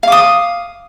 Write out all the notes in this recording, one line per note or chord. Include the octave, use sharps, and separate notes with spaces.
F5 D6 D#6